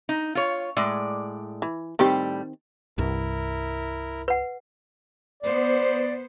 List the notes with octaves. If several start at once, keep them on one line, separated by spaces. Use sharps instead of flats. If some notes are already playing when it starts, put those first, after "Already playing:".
D#4
F4 C#5
A2 G#3 D5
E3
A2 D#3 G3 C4 G4
C2 G2 E4 A#4
B4 F#5
B3 C5 D5